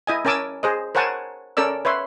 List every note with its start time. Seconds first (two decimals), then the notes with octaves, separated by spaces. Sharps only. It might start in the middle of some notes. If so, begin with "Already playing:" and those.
0.07 E4 D#5 G#5
0.25 C#4 A#4 G#5 A5 D6 E6
0.63 G#4 C5 D#5
0.95 A#4 C5 C#5 F#5 G#5 A5
1.57 C#4 A4 A#4 D5 E6
1.85 B4 C#5 E5 C6